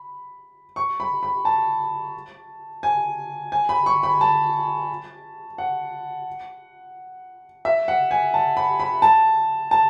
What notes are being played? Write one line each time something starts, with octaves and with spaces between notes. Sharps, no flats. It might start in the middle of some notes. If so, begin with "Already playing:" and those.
Already playing: B5
C#6
B5
B5
A5
G#5
G#5
B5
C#6
B5
A5
F#5
E5
F#5
G#5
A5
B5
B5
A5
A5